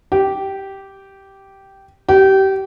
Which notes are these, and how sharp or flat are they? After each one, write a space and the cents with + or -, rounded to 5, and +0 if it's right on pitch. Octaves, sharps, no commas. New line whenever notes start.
G4 -10
G4 -25